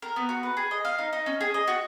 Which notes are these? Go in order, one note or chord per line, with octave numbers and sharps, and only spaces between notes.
A#4
B3
F#4
B4
G#4
D#5
F5
D#4
D#4
C#4
G#4
D#5
F#4